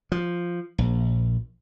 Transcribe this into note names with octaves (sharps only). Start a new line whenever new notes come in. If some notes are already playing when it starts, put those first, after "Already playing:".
F3
A#1